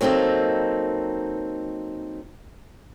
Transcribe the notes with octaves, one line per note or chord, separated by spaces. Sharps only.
F#3 A#3 C4 D#4 A4